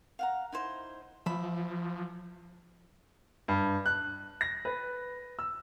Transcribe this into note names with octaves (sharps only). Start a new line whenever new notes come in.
F5 F#5 A#5
D#4 E4 C5
F3 E5 B5
G2
F#6
A#6
B4
E6